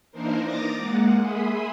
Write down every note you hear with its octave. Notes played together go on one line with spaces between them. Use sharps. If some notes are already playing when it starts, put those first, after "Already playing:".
E3 A#3 D4 D#4 A#4 C5
A#5 D6 D#6 A6 A#6
G#3 A#3 F#5
G#4 E5 B5 C6 D#6